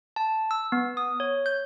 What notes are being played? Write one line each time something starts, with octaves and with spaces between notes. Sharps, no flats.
A5
E6
B3
D#6
C#5
G6